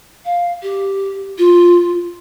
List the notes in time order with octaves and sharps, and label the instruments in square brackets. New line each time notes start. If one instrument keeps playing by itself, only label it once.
[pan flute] F5
G4
F4